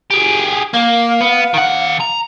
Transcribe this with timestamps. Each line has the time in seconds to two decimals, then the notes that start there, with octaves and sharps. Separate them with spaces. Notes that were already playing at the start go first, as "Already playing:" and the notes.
0.10 G4 G#4
0.74 A#3 F5
1.21 B3
1.54 D#3 F#5
2.01 A#5